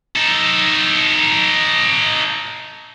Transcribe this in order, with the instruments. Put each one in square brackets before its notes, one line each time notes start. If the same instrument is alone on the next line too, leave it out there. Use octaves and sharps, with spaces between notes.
[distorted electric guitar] D#4 A4